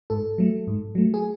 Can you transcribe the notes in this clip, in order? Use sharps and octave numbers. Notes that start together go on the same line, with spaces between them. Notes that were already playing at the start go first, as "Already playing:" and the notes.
G#2 A4
F#3 A3
G#2
F#3 A3
G#4